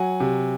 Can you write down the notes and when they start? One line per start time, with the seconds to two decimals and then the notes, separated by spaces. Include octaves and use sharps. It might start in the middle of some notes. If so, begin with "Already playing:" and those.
Already playing: F#3 F#5 G#5
0.20 C3